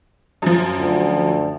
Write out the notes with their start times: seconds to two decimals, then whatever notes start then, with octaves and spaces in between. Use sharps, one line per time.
0.42 F#2 F3
0.78 D2